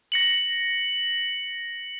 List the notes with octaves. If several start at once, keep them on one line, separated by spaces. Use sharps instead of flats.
A#6 C#7 F#7